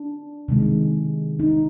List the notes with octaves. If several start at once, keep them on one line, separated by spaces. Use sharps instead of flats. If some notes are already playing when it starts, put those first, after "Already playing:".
Already playing: D4
C3 D#3 G#3
D#4